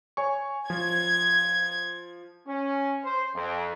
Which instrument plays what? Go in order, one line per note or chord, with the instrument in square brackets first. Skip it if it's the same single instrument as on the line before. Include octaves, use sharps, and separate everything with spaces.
[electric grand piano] C#5 G#5 C#6
[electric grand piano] F3 [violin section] G#6
[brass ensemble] C#4
C5
F2